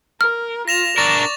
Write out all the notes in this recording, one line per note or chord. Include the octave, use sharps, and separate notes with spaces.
A#4 F6
F4 A#6 E7 F7
D4 A#4 D5 C#6 A6